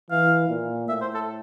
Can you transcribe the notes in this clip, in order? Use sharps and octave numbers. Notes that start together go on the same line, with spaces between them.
E3 F5
A#2
A2 E5
C5
A4